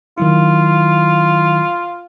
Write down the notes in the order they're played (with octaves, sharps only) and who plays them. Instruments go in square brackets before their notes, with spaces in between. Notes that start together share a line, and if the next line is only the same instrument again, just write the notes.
[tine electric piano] D#3 F#3 E4 [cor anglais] F4